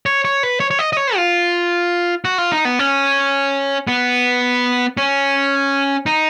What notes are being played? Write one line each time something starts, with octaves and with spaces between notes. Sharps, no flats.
C#5
C#5
B4
C#5
C#5
D#5
D#5
C#5
F4
F#4
F4
D#4
B3
C#4
B3
C#4
D#4